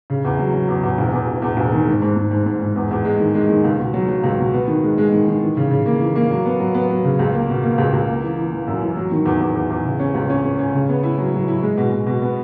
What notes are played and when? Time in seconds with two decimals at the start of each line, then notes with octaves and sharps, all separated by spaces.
0.10 C#3
0.25 E2
0.39 F#3
0.54 F#3
0.68 E2
0.83 E2
0.98 E1
1.13 E2
1.28 E1
1.42 E2
1.57 E1
1.72 D#3
1.87 G#2
2.02 G#2
2.16 G#2
2.31 G#2
2.46 G#2
2.61 G#2
2.76 E2
2.91 E2
3.05 G#3
3.20 D#3
3.35 G#3
3.49 D#3
3.64 C#2
3.79 B2
3.94 F#3
4.08 F#3
4.24 C#2
4.39 B2
4.54 B3
4.68 D#3
4.83 G#3
4.98 G#3
5.12 D#3
5.27 D#3
5.41 E3
5.57 C#3
5.71 C#3
5.86 A#3
6.01 E3
6.16 A#3
6.30 F#3
6.46 B3
6.60 F#3
6.74 B3
6.90 F#3
7.04 C#3
7.19 C#2
7.34 A#3
7.49 B2
7.63 A#3
7.78 C#2
7.93 C#2
8.08 A#3
8.23 E3
8.37 E3
8.52 E3
8.67 F#2
8.82 E3
8.97 F#3
9.11 D#3
9.26 E2
9.40 E2
9.56 E2
9.70 E2
9.85 C#3
10.00 C#4
10.14 C#2
10.30 C#4
10.45 C#4
10.59 C#4
10.74 C#3
10.89 B3
11.03 E4
11.18 F#3
11.34 F#3
11.48 E4
11.62 G#3
11.78 B2
11.92 B2
12.06 B2
12.22 B3